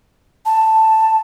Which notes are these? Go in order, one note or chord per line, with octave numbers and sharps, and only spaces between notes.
A5